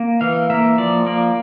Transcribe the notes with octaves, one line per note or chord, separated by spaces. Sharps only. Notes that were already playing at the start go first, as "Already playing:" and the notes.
Already playing: A#3
E3 F5
A#3 E5
F3 D5
A#3 D5